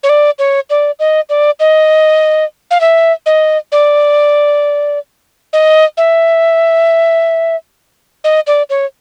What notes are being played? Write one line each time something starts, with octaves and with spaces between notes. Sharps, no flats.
C#5
D5
C#5
D5
D#5
D5
D#5
F5
E5
D#5
D5
D#5
E5
D#5
D5
C#5